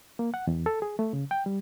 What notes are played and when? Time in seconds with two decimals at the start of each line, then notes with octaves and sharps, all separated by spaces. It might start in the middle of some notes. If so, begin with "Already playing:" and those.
0.19 A#3
0.34 F#5
0.47 E2
0.66 A4
0.82 G#4
0.99 A3
1.13 C#3
1.31 G5
1.46 G3